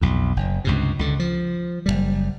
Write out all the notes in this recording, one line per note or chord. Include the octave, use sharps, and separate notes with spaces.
B1 F2
F#1
C#2 G2 C3
C#2 D3
F3
F#1 C#2 G3